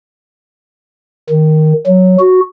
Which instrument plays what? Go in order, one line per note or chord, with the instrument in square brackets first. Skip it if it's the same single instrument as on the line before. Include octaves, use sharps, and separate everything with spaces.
[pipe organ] D#3
F#3
F#4